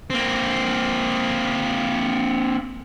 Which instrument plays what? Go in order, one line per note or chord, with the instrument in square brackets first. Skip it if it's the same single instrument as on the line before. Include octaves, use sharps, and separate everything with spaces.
[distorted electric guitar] A#3 C4